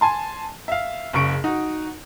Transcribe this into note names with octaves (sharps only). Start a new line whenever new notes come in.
G#5 A5 C6
E5 F5
F#1 C#3 C#6 D7
D#4 F#4